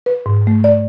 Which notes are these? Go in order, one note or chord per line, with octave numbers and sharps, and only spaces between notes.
B4
G#2
A3
D5